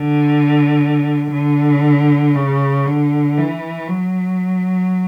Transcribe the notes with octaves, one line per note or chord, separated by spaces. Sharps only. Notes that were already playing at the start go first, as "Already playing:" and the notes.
Already playing: D3
D3
C#3
D3
E3
F#3